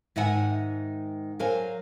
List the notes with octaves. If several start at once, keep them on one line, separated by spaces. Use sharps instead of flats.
G#2 D#3 E5 F#5 G#5
F#3 A#4 C5 F5 G#5